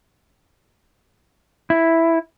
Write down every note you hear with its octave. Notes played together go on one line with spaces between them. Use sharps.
E4